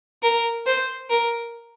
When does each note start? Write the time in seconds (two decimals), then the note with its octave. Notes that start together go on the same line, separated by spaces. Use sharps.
0.23 A#4
0.66 C5
1.09 A#4